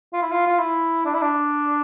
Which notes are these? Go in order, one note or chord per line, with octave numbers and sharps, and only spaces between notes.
F4
E4
F4
F4
E4
D4
E4
D4